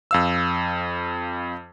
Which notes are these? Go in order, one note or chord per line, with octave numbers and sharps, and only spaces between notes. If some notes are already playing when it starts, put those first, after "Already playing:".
F2 F5 E6